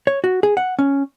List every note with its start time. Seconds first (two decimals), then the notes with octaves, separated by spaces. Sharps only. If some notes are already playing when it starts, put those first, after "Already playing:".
0.07 C#5
0.24 F#4
0.43 G#4
0.57 F#5
0.79 C#4